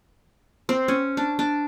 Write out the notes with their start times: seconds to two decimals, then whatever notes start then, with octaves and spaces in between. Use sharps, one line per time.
0.69 C4
0.88 C#4
1.17 D4
1.39 D4